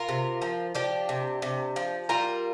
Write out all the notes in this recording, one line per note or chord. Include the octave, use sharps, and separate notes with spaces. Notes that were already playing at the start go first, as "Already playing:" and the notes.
Already playing: F4 A#4
C3
F3
F3 D4 G4
C3
C3
F3
G3 F4 A#4